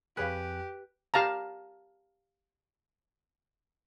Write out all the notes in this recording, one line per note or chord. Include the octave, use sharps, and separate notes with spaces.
F2 G4 G#4 B4 C#5 F5 G#5 F#6
G4 F5 A5 A#5